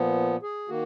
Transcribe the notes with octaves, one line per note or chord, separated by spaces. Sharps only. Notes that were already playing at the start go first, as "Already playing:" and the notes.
Already playing: A#2 F3 B3
G#4
D#3 A#3 F#4